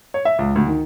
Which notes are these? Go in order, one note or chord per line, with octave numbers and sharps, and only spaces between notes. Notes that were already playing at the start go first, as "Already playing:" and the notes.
C#5
E5
C#2
D2
D#3